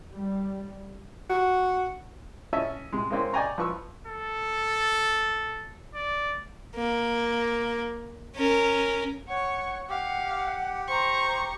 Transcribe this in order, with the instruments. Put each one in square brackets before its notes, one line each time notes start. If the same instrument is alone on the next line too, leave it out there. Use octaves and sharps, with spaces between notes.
[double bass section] G3
[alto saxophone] F#4
[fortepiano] C#4 D#5 E5 A5
C3 G#3
G#3 A#3 C4 C#4
D5 D#5 G5 G#5 A#5 C#6
F3 B4 C#6 E6
[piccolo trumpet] A4
D5
[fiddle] A#3
C#4 A#4
[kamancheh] C#5 C#6 [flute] F#5
[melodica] G4 [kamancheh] F5 [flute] F#5
[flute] C5 [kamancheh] A#5 C#6